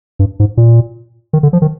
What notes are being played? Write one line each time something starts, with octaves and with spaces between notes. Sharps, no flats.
G2
G#2
A#2
D#3
D3
F3
D#3